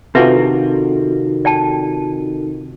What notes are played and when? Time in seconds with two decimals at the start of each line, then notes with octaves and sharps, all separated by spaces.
0.15 C3 D#3 D4 F4 F#4 A4 B4 E5
1.45 D5 G5 A5